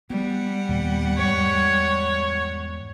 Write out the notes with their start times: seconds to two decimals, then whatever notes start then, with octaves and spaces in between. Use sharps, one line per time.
0.10 G3 B3 F#5
0.69 D#2 A#2 B3
1.18 E2 G#2 C#5